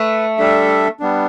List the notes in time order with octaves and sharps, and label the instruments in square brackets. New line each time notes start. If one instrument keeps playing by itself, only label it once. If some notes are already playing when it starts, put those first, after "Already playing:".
Already playing: [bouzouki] A3 [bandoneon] B4
[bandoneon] G3 D4 A4 E5
G3 B3 D4